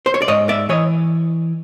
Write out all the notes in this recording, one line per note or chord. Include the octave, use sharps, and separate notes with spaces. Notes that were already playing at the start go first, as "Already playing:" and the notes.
C5
C#5
D5
G#2 C#5 D#5
D5 E5
E3 C#5 D#5